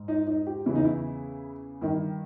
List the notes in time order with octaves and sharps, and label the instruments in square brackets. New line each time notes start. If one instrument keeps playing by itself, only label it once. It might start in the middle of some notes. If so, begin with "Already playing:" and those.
Already playing: [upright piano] G#2
D#4
D#4
G4
E2 C#3 E3 E4
D#4
E4
G2 D#3 E4